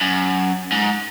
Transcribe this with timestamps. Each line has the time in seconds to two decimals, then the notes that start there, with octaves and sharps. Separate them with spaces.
0.01 F#2
0.72 G#2